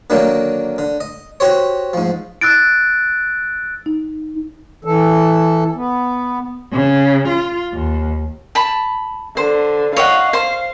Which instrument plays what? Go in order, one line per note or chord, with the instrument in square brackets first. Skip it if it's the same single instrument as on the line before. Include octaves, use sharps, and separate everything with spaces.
[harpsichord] D3 D#3 F#3 A#3 D4
D3
D#5
F#4 G4 C5 C#5
G#2 F3
[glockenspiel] E6 F#6 A6 D7
[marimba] D#4
[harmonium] E3 A4
B3
[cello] C#3
F4
D#2
[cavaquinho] A5 B5
[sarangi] D3 [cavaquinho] C5
[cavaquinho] C#5 D#5 F#5 [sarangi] F5
[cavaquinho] C5